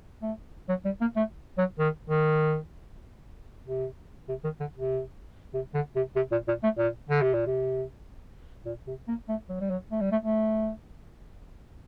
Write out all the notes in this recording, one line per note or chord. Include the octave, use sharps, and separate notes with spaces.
A3
F#3
G3
A#3
A3
F#3
D#3
D#3
C3
C3
D#3
D3
C3
C3
D3
C3
C3
A#2
A#2
A3
A#2
D3
C3
A#2
C3
A#2
C3
A#3
A3
F#3
G3
F#3
A3
G3
A3
A3